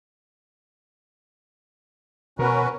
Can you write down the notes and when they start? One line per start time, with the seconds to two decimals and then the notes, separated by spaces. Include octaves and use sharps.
2.39 B2 C#4 F#4 A#4 B4